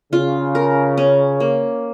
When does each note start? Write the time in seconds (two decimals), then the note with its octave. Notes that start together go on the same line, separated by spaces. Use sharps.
0.13 C#3 F4
0.55 A#4
0.98 C#4
1.40 A#3